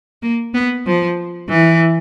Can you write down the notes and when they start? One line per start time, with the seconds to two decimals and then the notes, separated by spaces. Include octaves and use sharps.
0.22 A#3
0.54 B3
0.86 F3
1.49 E3